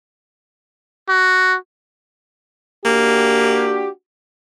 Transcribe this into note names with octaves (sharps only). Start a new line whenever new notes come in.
F#4
A#3 D4 F#4 G4